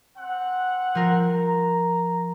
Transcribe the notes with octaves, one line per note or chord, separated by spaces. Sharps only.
C4 F#5
F3 A#4
A#5